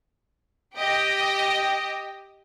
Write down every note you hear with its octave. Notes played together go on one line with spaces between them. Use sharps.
G4 D#5 G5